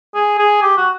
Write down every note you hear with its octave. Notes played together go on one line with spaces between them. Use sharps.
G#4
G#4
G4
F#4